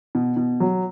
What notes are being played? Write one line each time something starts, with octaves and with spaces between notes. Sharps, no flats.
B2
B2
F#3